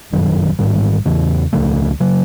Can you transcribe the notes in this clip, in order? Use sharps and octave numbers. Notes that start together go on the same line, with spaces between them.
G1 F#2 D#3 F#3
A1 G#2 D#3 G3
E2 C#3 E3
C#2 C#3 F3 A3
C#3 F#3